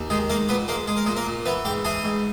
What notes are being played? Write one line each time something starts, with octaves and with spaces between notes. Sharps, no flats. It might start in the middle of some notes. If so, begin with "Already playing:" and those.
Already playing: D#2
D#3 G#3 G#4
G#3 A#3 A#4
A#2 B3 B4
G#3 A#3 A#4
G#3 G#4
A#4
A#2 G#3 G#4
A#3 A#4
A#2
E3 B3 B4
G#2 G4 G5
E3 G#4 G#5
G#2